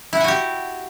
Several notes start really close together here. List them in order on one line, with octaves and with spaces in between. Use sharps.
E4 F#5 G#5 F#4 G4